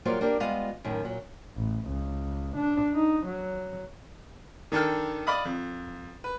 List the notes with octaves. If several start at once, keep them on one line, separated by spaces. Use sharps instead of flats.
F#3 G3 A#3 F4 C5 D5
A#3 D4 G4 A#4
G3 G#3 B3 F4 D#5 F5
F#2 A2 D#3
A#2 F#3
A1
C#2
D4
D#4
F#3
D#3 D4 A4 G5 F6
D5 D#5 F5 B5 D#6
F2
B4